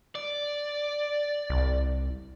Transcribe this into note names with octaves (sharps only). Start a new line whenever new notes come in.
D5
C2